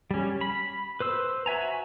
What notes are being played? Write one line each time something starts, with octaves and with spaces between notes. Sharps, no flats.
G3 C#4
B5
B4 C5 E6
F#4 E5 G#5 A#5